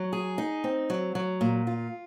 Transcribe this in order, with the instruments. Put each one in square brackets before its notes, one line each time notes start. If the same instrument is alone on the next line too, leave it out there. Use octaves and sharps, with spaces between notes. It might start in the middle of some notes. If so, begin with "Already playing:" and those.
Already playing: [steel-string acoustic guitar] F#3
G#4
D#4
C4
F#3
F#3
A#2
F4